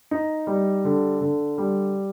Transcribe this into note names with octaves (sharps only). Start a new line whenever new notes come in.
D#4
G3
D3
D3
G3